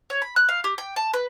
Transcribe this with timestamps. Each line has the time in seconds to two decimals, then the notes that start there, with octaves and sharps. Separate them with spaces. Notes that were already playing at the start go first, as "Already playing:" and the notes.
0.10 C#5
0.22 B5
0.36 F#6
0.49 F5
0.64 G4
0.78 G5
0.96 A5
1.14 B4